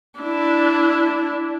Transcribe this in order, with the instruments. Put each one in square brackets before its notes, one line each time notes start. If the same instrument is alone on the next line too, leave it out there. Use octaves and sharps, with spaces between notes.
[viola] D4 E4